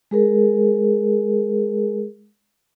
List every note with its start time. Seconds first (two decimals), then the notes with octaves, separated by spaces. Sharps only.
0.11 G#3 G#4 A#4